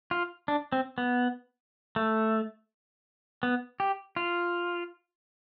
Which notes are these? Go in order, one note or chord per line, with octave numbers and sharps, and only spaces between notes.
F4
D4
C4
B3
A3
B3
G4
F4